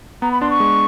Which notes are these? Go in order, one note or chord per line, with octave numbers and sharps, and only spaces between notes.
B3 A#5
B5
D4 C6
C#6
G#3